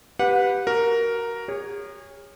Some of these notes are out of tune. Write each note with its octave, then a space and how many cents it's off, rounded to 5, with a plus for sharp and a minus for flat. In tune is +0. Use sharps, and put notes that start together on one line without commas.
G4 +0 B4 +0 F#5 -30
F#4 +25 A#4 +0
G#4 -35 C#5 +0